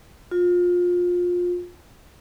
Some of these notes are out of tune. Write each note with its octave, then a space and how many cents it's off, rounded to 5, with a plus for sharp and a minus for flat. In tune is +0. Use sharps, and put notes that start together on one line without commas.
F4 +25